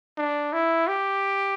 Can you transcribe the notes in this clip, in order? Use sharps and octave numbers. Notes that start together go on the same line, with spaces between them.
D4
E4
G4